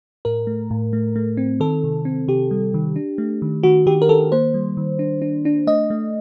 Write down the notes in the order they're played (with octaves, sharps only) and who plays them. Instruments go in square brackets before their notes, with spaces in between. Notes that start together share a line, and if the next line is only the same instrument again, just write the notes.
[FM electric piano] A2 A#4
A3
A2
A3
A3
C4
D#3 A4
C3
C4
C3 G4
G3
D#3
D4
A3
D#3
D#3 F#4
D#3 G4
A#4
D#3 A4
A#3 C5
G3
D#3
D4
D4
D4
A3 D#5
A3